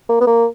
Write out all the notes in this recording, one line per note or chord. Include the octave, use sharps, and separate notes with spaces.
A#3
B3
A#3